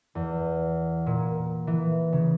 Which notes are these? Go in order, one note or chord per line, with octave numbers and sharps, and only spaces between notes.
E2
A#2
E3
C#3